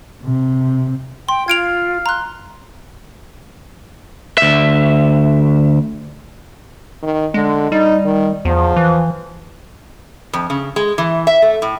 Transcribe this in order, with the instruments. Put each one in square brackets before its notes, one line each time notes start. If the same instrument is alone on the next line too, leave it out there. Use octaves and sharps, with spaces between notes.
[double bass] C3
[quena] G5 [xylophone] C6
[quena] F4 [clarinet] F5 [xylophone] G#6 D7 F7
[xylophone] A#5 F#6 [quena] C6
[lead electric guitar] D2 E5
[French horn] D#3
[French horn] D3 [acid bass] G#3
[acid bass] G3 [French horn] D#4
[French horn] D#3
[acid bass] E2 [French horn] F3
[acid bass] E3
[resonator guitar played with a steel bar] F2
C#3
G#3
E3
E5
A3
A2